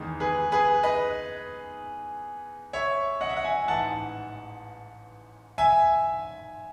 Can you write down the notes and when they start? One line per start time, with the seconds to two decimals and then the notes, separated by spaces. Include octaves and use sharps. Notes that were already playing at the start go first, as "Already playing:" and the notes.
Already playing: E2 D#3 G#3
0.20 G#4 B4
0.52 G#4 B4
0.83 B4 D#5
2.73 C#5 E5
3.21 D#5 F#5
3.29 E5
3.37 F#5
3.44 E5 G#5
3.68 A1 G#2 E3 F#5 A5
5.58 E5 G#5